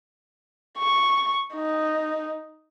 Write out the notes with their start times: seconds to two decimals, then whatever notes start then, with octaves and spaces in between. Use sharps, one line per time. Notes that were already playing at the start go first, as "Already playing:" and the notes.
0.78 C#6
1.54 D#4